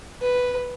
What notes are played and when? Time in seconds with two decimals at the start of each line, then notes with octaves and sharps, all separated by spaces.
0.22 B4